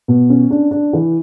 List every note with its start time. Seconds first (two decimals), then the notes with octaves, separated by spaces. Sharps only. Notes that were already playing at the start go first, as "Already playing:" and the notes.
0.08 B2
0.30 C#4
0.50 D4
0.71 D4
0.93 E3